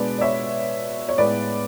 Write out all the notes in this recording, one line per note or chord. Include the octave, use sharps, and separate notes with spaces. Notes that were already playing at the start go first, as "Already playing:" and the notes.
Already playing: B2 G#3 D4 B4 D5
D5
C#5 E5
C#5
A2 G#3 B3 B4 D5